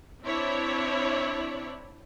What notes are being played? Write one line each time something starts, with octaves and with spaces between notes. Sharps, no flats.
C4 D4 E4 C#5 D5